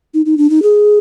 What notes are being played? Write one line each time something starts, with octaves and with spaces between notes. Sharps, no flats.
D#4
D#4
D4
D#4
G#4